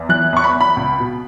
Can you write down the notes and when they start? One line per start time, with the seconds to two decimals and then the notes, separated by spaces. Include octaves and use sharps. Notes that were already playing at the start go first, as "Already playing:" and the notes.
Already playing: E2
0.09 E3 F#6
0.33 E2 C#6
0.44 B5
0.55 E2
0.61 B5
0.77 C#2
1.00 B2